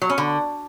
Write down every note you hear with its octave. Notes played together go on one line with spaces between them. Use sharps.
F#3
C#4
D3